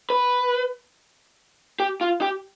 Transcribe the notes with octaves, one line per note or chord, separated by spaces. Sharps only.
B4
G4
F4
G4